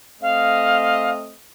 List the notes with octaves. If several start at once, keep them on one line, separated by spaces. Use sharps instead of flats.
A3 C4 D#5 F5